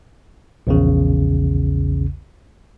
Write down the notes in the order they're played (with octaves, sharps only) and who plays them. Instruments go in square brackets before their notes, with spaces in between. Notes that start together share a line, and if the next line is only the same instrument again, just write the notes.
[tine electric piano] A#1 E2 C#3